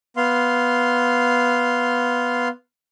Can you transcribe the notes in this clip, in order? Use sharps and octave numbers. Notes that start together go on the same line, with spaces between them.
B3 F5 C6